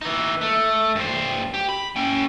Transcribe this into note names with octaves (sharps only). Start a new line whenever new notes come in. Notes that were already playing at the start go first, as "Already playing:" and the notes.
E3 D#4
A3
G2 C5
G4
B5
C#4 G5